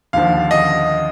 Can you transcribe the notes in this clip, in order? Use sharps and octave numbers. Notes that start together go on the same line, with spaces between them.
D#2 D3 F3 F5
D#5